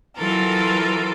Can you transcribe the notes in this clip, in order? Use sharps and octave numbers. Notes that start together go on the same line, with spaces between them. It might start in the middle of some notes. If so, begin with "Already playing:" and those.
E3 F#3 F4 A4 A#4